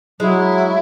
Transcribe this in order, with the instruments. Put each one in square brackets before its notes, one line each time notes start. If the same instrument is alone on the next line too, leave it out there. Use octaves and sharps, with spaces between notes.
[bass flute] F#3 [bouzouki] G#3 [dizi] E4